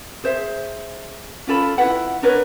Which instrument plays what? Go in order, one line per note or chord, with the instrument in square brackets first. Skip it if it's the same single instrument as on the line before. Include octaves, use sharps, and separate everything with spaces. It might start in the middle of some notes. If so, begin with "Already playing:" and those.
[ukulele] G#4 C5 E5
C#4 F4 A4 B5
E4 F4 B4 F#5
D4 A#4 B4 C#5